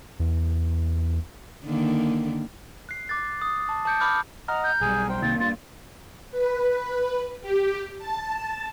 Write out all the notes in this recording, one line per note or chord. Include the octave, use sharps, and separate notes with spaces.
E2
D3 D#3 A#3
F#6 C7
D6 F#6 A6
D#6
A5
A5 D6 G6 C#7 D7
A5 B5 D6 F6 G6
D#5 F#5 A#5 F6
G6
B1 G3 G#4 G#5
C5 G5
C2 C3 D#3 A#3 G5 A6
G2 F4 A6
B4
G4
A5